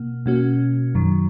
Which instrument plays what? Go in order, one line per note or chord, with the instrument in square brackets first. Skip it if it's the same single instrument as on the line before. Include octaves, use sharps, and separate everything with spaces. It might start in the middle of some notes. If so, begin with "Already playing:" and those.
Already playing: [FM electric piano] B2 A#3
B2 A#3 C#4 F#4
F#2 D#3 F#3